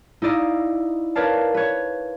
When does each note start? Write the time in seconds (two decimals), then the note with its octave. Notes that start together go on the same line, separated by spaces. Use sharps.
0.22 D#4 E4 D5 D#5 F5
1.16 A#4 B4 C#5 D5 F5 A5
1.54 B4 C#5